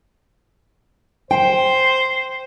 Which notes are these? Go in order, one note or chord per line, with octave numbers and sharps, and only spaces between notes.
C5 G5